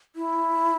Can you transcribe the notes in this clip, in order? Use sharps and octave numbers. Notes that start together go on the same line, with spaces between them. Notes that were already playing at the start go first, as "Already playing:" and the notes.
E4